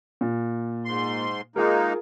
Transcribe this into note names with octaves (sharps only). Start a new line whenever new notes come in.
A#2
G#2 C6
G#3 A#3 D#4 F4 G#4 A#4